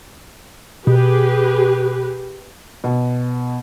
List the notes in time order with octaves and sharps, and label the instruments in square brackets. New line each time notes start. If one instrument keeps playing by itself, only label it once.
[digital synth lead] B2 [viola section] G4 G#4 B4
[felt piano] B2